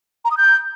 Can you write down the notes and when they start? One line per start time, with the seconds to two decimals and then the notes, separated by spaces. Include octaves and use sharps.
0.25 A#5
0.31 D#6
0.37 G6